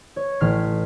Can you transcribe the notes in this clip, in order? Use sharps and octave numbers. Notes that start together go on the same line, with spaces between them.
C#5
A1 F6 B6 C7